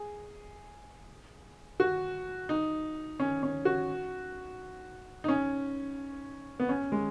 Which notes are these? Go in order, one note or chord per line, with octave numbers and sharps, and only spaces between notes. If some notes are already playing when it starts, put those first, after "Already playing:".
Already playing: G#4
F#4
D#4
C#4
C#4
F#4
D#4
C#4
B3
C#4
G#3